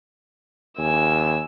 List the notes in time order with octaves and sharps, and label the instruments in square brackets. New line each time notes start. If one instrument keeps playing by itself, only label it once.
[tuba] D#2 [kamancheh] G#5 E6